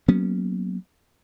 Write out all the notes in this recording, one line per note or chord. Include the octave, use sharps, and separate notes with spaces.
F#3 A#3 B3 C#4